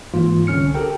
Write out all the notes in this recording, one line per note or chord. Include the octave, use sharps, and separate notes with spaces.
G#2 E3 A#3 F4
C2 D3 C#4 F6 C#7
G4 A4 A#4 G5